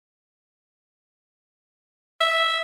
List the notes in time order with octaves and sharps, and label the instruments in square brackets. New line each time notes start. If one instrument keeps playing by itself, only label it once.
[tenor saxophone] E5